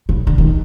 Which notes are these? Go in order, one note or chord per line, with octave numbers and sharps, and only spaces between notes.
C#3
D3
D#3